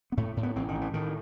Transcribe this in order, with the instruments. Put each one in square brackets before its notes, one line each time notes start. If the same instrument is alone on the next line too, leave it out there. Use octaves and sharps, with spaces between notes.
[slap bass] B3
A2 A3
A2
B3
A1 C4
D#3
A2
E3
A2 D#3